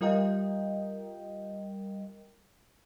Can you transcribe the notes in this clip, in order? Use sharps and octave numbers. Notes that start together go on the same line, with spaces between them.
G3 F4 A#4 D#5 G5